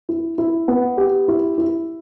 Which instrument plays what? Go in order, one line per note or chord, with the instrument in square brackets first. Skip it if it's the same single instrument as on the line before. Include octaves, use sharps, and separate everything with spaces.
[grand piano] E4
E4
B3
G4
E4
E4